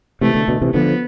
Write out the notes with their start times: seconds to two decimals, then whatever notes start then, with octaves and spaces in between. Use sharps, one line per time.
0.21 C3 E3 A3
0.35 B2 D3
0.48 B2 D3
0.62 C3 E3
0.74 D3 F3 B3